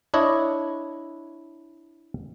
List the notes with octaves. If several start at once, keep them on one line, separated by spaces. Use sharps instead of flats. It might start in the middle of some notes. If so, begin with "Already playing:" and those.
D4 E4 C#5 D#5